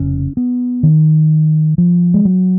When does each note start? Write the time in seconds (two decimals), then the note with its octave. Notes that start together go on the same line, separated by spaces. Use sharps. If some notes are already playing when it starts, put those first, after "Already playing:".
Already playing: F1 F2 C#3 C#4
0.37 B3
0.83 D#3
1.78 F3
2.14 G#3
2.25 F#3